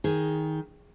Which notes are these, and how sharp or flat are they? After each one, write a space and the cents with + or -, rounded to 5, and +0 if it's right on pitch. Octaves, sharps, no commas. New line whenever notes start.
D#3 +15 G#4 +0